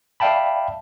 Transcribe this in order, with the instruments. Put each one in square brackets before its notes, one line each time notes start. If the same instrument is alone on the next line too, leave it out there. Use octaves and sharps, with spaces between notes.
[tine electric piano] D5 E5 F5 G5 A5 B5